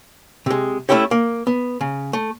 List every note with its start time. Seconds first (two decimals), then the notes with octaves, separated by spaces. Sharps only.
0.46 C3 G#3
0.89 A3 B3 C#4 E4 G4 C#5
1.11 A#3
1.47 B3
1.81 C#3
2.13 A3